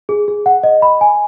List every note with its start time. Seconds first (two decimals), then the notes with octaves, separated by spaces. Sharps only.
0.09 G#4
0.28 G#4
0.46 F#5
0.63 D#5
0.82 B5
1.01 G#5